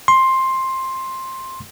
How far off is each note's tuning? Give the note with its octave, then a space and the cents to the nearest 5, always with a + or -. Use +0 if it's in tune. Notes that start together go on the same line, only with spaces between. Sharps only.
C6 +10